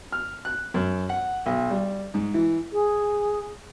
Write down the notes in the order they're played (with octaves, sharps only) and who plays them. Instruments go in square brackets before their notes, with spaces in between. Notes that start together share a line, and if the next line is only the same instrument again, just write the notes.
[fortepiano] F6
F#6
F#2
F#5
B1
G3
G#2
E3
[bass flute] G#4